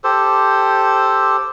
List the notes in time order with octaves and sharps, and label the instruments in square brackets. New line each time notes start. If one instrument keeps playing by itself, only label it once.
[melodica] G4 A4 C5